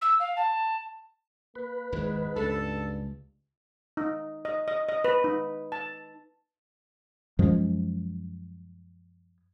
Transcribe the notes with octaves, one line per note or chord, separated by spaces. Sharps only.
E6
F5
A5
A#3 B4
G#1 E2 G#2
C#2 G2 A4
D#4
D#5
D#5
D#5
B4
D#4
A5
F#2 F3 G#3